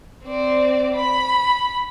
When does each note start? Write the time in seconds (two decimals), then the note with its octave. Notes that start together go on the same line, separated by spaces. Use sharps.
0.25 C4 D5
0.96 B5